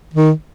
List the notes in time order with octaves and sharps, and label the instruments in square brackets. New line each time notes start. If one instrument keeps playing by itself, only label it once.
[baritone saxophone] D#3